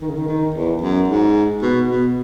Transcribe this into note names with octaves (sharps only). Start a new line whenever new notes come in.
D#3
C#3
D#3
D#3
E2
F#2
G#2
B2
B2